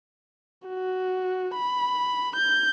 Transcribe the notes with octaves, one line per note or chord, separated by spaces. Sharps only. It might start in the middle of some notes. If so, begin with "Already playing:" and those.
F#4
B5
G6